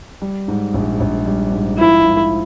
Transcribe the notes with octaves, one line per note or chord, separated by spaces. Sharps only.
G3
G#2
A#1
A#1
G3
G#2
F3 E4
G#2